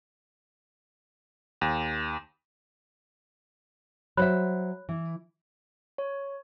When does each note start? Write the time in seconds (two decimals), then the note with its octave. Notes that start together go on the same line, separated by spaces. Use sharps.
1.61 D#2
4.17 F#3 C5 C#5 E5 B5 F#6
4.89 E3
5.98 C#5